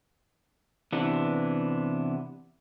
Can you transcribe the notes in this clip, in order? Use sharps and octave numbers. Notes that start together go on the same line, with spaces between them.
C3 E3 B3 D4